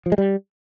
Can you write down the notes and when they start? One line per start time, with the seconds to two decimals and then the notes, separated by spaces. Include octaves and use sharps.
0.06 F3
0.12 G#3
0.18 G3